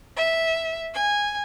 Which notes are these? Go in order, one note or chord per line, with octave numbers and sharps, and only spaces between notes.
E5
G#5